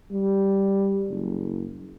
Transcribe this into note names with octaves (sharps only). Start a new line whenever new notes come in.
G3
F#1